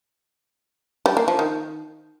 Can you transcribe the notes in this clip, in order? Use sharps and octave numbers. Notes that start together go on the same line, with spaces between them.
G3
A#3
F3
D#3